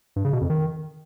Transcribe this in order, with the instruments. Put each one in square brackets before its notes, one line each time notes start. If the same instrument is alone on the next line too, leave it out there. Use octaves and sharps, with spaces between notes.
[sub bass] G2
C#3
B2
F2
D#3